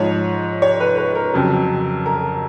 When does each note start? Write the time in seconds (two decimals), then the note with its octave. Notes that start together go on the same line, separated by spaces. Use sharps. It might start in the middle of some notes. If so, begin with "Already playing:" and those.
Already playing: G#2 F3 C#5
0.62 C#5
0.80 B4
0.98 B4
1.15 A#4
1.34 F2 C#3 F#3
2.06 A#4